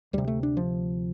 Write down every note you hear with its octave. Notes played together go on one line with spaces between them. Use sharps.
D2 C3 G3
A3
D4
F3